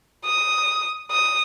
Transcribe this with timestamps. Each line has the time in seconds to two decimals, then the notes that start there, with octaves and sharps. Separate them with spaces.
0.25 D#6
1.11 D#6